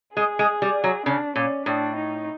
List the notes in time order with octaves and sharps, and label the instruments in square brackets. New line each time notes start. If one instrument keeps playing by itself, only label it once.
[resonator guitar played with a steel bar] G#3 [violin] G#4
[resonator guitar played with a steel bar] G#3
G3
F#3
[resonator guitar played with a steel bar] C#3 [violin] D4
[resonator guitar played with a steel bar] A#2 [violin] C#4
[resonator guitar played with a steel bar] A2 [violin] D4
[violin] D#4